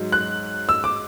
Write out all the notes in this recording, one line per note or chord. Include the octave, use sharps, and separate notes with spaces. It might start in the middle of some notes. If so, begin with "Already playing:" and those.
Already playing: G#2 F#3
F#6
E6
D6